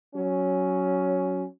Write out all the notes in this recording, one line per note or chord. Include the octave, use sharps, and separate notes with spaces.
F#3 C#4